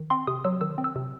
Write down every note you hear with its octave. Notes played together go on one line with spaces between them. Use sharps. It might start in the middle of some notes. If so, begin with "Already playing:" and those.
Already playing: D#3
C4 C6
C3 D#6
F#3 E6
D#3 E6
C4
E6
C3